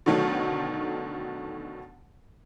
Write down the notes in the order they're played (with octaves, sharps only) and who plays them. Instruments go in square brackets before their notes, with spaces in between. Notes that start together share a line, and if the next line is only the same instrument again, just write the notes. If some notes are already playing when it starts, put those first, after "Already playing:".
[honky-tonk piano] B2 D3 D#3 F#3 A3